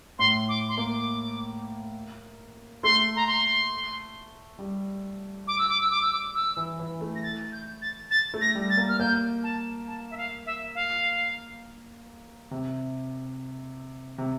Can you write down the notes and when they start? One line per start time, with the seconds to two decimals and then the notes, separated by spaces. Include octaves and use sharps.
0.19 A2 C6
0.49 D6
0.69 C6
0.77 A#3 D6
2.83 A3 C6
3.16 A#5
3.27 C6
4.59 G3
5.47 D6
5.59 E6
5.70 D6
5.81 E6
5.91 D6
6.02 E6
6.13 D6
6.35 E6
6.57 E3
6.79 E3
7.01 A3
7.15 A#6
7.23 A6
7.53 G6
7.82 A6
8.11 A6
8.34 A3
8.41 A#6
8.55 G3
8.70 A6
8.77 A#3
8.89 F6
8.99 A#3 G6
9.43 A5
9.87 A5
10.11 E5
10.17 F5
10.46 E5
10.75 F5
12.51 C3
14.18 C3